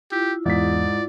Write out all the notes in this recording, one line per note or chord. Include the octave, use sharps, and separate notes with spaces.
E4 F4 G4
E2 G#2 D5 B6